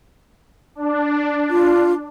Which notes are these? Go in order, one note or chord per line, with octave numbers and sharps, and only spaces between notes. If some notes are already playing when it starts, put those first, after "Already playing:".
D4
F4